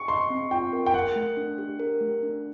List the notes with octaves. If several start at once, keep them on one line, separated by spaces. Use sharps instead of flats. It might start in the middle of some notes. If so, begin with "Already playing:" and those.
Already playing: C#6
D#5 C6
C4
F4 G5
A#4
G5
A#4 F#5
A3
D4
G4
A#4
A3
D4